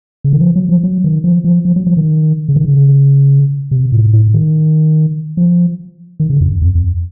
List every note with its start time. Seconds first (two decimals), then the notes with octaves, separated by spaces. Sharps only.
0.24 C#3
0.33 D#3
0.41 F3
0.56 F#3
0.69 F3
0.83 F#3
1.04 D#3
1.24 F3
1.44 F3
1.65 F3
1.76 F#3
1.86 F3
1.97 D#3
2.48 C#3
2.56 D#3
2.65 C#3
3.71 C3
3.92 A2
4.13 A2
4.34 D#3
5.37 F3
6.20 D#3
6.30 C#3
6.40 F2
6.51 F#2
6.62 F2
6.75 F2